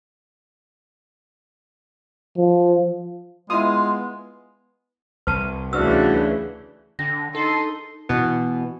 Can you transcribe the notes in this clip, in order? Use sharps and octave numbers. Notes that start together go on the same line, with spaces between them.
F3
G#3 B3 E4 F4 D#6
C2 B4 A5
D2 C#3 E3 D4 F#4 B4 E6
D3 D4 A#6
D#4 A4 C6
B2 E3 B3